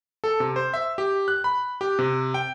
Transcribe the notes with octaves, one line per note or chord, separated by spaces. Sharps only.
A4
C3
C5
E5
G4
F#6
B5
G4
C3
G5